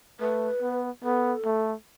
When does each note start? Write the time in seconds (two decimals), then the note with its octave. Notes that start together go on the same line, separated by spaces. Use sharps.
0.20 A3 B4
0.61 B3
1.03 B3 A4
1.45 A3